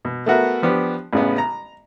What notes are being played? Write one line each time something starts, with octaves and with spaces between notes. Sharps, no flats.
B2
A3 B3 F#4 A#4
F3 B3 D4 G4
A1 C#3 B3
A#5